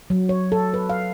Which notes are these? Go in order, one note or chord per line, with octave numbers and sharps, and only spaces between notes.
F#3
C#5
A4
B4
F5